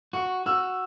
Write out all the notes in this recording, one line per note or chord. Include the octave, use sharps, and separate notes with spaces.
F#4 C#6
F#4 E6